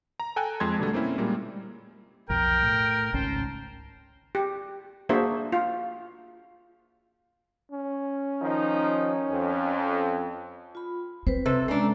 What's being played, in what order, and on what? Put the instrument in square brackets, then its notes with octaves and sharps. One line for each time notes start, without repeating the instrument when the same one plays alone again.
[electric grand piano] A#5
A4 G5 G#5 A#5 F#6
F2 G#3 A5 C6 G#6
B2 D3 G3 A3
A#3 C4 C#4 E4
A#2 G3 G#3 A#3
[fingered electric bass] B1 F2 [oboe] A#4 [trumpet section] G5
[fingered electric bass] A2
[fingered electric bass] G#1 C#2 C#4 [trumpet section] C5 G5 A5
[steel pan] G4
A#3 D4 F#4 G#4 C5 E5
F4
[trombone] C#4
[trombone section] D#3 F3 D#4
F2
[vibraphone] F4 B5
[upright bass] C4 [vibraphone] B4 C5
[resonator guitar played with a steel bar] C3 A4
[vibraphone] G#3 C#4 A#5 [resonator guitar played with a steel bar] A3 D4